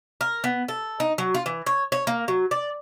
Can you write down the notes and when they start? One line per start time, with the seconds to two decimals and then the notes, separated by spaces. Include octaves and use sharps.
0.21 A#4
0.44 B3
0.68 A4
1.00 D#4
1.18 F#3
1.35 F4
1.46 E3
1.66 C#5
1.92 C#5
2.07 A#3
2.28 F#3
2.51 D5